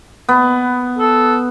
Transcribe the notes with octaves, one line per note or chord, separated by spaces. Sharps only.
B3
A4